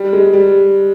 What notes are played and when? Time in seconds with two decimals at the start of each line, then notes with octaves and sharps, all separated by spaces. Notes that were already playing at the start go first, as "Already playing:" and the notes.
Already playing: G3
0.13 G#3
0.33 G3